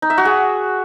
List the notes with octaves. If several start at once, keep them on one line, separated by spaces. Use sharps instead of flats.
D#4
E5
F#4
G#4